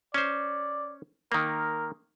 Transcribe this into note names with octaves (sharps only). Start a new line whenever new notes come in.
C#4 C5 D5
D#3 A#3 A#4